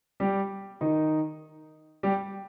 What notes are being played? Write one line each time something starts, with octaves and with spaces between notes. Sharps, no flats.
G3 G4
D#3 D#4
G3 G4